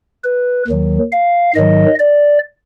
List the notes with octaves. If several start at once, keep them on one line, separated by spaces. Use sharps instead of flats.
B4
D#2 D#3 F#3
F5
G#2 D#3 F#3 D#5
D5